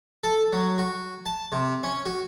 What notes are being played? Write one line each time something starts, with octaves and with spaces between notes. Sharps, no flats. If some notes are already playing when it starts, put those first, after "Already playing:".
A4
F#3
F#4
A5
C3
C#4
F#4